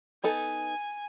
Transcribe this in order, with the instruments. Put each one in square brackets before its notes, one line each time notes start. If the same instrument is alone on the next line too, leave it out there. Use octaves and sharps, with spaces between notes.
[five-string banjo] B3 D#4 A4 [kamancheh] G#5